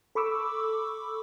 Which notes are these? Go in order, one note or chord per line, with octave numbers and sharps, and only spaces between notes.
A4 B5 C#6 D6 E6